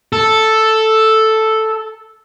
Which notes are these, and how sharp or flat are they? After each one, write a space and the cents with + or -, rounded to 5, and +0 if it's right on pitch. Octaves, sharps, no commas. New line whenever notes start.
A4 +0